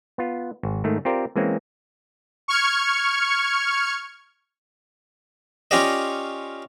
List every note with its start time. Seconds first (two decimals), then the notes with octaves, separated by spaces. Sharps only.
0.18 B3 F4
0.63 G#1
0.84 G#2 D#3 A3
1.05 C4 F4 G4 A#4 C5 D5
1.36 E3 G#3 A#3 C4 C#4
2.48 C#6 F6 G#6 C#7
5.71 C#4 F4 G4 D5 D#5